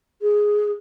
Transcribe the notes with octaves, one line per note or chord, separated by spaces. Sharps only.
G#4